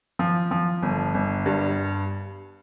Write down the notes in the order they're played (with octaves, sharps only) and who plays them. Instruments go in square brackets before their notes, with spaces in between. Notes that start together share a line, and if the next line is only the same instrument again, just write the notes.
[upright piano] F3
F3
G1
G1
G2